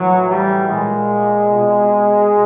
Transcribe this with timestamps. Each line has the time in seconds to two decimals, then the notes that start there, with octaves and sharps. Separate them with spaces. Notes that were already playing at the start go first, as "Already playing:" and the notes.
Already playing: A2 E3 F#3
0.30 G3
0.69 A#2 G#3
1.51 B2